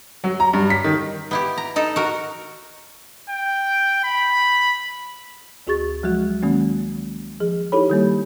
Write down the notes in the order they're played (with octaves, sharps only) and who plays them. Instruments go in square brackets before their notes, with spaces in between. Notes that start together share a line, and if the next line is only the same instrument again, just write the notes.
[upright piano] F#3
A#5
G2
B6
D#3
[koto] B3 E4 G4
A#5
D#4 A4
F#4 A#4
[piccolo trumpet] G5
B5
[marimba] D2 F#4 G#4 C#6 A6
F3 F#3 G#3 F#4
D#3 G#3 A#3 C#4
F3 G#4
D#4 E4 G4 A4 C#5 B5
D#3 G3 A#3